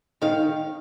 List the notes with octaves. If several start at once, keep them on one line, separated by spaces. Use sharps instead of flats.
D#3 F5